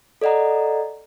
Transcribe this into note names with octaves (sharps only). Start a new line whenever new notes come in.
A4 D5 D#5 F#5 A#5